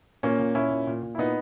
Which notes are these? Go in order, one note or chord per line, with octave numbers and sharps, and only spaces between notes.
A#2 A#3 C#4
A#2
A#2 C#4 E4
A#2
A#2
A#2
E4
A#2 B3 D#4